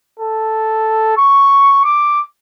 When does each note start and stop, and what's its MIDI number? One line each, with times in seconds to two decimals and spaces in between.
0.20 1.14 69
1.17 1.81 85
1.84 2.21 86